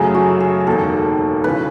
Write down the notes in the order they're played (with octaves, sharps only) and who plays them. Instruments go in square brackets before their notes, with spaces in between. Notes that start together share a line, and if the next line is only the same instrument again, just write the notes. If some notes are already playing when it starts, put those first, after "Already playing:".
Already playing: [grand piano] F#2 C#3 F#3 A3 [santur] G#4
[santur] F#4
G#4
[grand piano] E1 D#2 D#3 [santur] A4
[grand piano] G#1 C#3 E3 [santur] B4